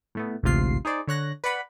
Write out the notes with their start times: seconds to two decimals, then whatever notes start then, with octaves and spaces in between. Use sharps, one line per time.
0.15 A2 A3 B3
0.43 A1 D2 G#2 C3 F4 C7
0.85 D#4 G#4 C5 D5
1.07 D3 C#5 F#6 A#6
1.44 B4 D5 F#5 B5